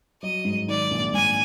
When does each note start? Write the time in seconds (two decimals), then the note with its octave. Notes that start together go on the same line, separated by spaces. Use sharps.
0.22 F#3 D#5
0.45 G#2
0.68 D#3 D5
0.91 A#1
1.14 G#2 G#5